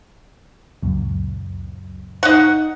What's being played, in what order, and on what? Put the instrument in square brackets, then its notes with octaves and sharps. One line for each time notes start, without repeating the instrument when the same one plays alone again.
[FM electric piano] C#2 F#2 A#2
[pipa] D#4 F#5